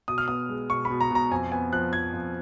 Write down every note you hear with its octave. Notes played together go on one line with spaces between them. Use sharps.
B2 D#6
F6
B3 D#6
G#3
B2 C#6
B5
B2
A#5
B2 A#5
F2 G#5
B3 G#5
F3 F#6
F2 G#6
F2